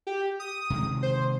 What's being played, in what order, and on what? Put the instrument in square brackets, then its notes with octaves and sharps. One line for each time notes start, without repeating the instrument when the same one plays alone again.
[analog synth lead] G4
D#6
[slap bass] C3 D#3 G#3
[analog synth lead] C5